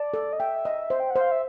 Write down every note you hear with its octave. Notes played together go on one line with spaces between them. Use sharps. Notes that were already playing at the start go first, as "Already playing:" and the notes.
Already playing: D5 A5
A4
D#5
E5 G5
D#5
C5
G5
C5 F#5
F5
E5